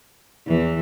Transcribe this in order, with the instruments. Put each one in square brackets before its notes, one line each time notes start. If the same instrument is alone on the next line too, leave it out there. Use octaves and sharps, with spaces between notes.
[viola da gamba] E2 E3